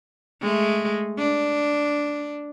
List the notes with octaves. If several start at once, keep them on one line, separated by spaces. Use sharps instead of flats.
G#3 A3
D4